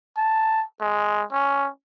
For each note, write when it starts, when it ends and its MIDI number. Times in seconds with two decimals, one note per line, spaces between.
0.17 0.63 81
0.81 1.23 56
1.32 1.69 61